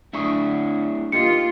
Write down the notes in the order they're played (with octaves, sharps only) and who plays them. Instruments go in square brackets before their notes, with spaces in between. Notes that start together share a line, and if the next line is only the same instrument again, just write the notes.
[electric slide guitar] A3 D4 E4 [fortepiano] E5 C#6 D#6
[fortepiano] A#3 D#4 G4 [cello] F4 [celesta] C#7